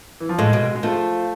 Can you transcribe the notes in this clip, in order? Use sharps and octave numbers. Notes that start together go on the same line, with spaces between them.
E3
F3
A2 G#3
B2
G#3
F3 A3